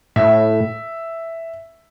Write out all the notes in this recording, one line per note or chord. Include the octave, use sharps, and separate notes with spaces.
A2 E5